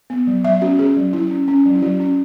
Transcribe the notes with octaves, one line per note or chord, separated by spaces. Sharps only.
B3
F#3
F#3 E5
C#4 F#4
C#4 G#4
F#3
F#3 E4
C#4
C#4
F#3
E4
F#3 F#4
C#4